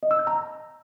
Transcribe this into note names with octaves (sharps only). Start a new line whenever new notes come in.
D#5
E6
G6
A#5